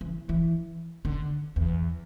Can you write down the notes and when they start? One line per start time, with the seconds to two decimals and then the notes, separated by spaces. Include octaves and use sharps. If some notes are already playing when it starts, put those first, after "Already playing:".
0.01 E3
0.29 E3
1.05 D3
1.56 E2